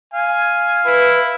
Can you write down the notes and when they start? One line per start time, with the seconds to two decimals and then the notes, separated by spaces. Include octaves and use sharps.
0.14 F5 G#5
0.85 E4 B4